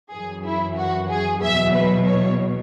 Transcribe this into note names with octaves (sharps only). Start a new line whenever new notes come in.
F#2 E3 G#4
E4
F#4
G#4
E2 B2 F#3 E5
B4
C#5